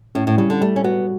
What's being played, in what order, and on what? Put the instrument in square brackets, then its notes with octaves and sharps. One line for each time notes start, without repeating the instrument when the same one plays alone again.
[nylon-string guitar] A2 [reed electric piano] C#4
[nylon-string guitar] A2
[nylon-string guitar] C#3 [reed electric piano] G3
[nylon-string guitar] D3
[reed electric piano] G3 [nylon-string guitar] A3
[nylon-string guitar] C#4
[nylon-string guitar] B3 [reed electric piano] F#4